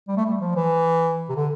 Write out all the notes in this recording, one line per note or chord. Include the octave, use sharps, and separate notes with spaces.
G3
A3
G3
F3
E3
C3
D3